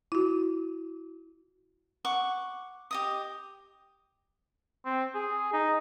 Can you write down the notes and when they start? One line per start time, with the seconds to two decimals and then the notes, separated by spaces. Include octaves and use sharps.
0.12 E4 F#4
2.05 F#5 C#6 D6
2.91 G4 D#5 D#6
4.85 C4
5.15 G#4
5.53 D#4